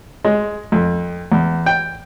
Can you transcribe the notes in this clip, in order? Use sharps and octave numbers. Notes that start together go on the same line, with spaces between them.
G#3
F2
E2
G5